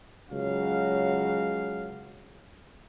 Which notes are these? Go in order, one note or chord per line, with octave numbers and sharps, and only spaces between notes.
C#2 C#3 F#3 F#4 F5